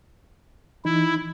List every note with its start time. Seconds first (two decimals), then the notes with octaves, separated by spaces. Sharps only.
0.85 E3 D#4 E4